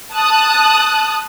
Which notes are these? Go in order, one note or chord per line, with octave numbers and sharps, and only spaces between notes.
A5 D#6 F#6